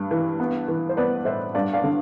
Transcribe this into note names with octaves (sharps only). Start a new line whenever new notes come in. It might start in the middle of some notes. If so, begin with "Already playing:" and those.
Already playing: G2 G3
E3
B3
E3
C5
B3 B4 D5
A2 C5 E5
G2 D5 F5
D5 F5
D3